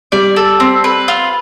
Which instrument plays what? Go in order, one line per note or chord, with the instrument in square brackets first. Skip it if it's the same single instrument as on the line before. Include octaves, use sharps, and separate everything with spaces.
[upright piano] G3 [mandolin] D5
[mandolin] A4
C4
B4
F4